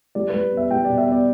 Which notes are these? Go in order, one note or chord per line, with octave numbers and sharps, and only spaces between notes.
G3 D5
B4
G3
B3 E5
G3 G5
D5
B2
E5
B3 D5